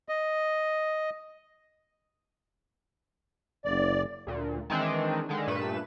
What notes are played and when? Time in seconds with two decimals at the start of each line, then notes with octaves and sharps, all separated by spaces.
0.09 D#5
3.65 F#1 D5
4.27 D2 A#2
4.70 D#3 E3 G#3 C4 D4
5.29 D3 D#3 G#3
5.47 G2 A#2 A3 B4 E7